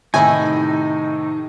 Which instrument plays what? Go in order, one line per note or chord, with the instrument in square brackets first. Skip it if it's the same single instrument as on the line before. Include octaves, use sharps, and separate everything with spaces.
[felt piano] A2 C3 D#3 [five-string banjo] A3 E4 [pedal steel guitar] D#4 [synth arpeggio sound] G#5